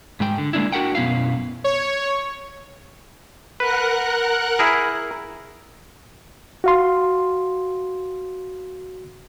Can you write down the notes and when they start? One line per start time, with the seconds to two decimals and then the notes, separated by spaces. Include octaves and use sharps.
0.20 G#2 G#3 G5
0.38 D3
0.53 G#3 A#3 D4 E4
0.72 D4 F#4 A#4 F#5 G5
0.95 F#2 B2 B3 C#4 E4 F5
1.64 C#5
3.60 A#4 B4 F#5 F#6
4.59 E4 G#4 A#4
6.64 F#4 F5 C6